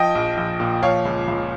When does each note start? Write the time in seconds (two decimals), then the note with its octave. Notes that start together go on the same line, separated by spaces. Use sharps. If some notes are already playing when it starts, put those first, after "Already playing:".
Already playing: F3 D#5 G5
0.15 A#1
0.37 A#1
0.60 A#2
0.82 F3 C#5 F5
1.05 C#2
1.28 C#2